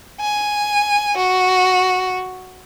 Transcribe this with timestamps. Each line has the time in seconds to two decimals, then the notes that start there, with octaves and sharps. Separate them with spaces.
0.21 G#5
1.17 F#4